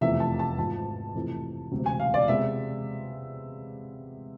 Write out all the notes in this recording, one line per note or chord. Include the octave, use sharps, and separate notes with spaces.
F1 E2 C3 F3 A3 E5
A5
A5
G#1 G#2 F3 A5
F2 C3 E3 A3
E1 D2 C3
G#5
F5
D5
C3 G#3 B3 E5